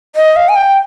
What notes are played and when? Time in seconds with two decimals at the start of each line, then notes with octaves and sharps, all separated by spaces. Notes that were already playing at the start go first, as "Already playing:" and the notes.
0.16 D#5
0.36 F5
0.49 G#5
0.56 G5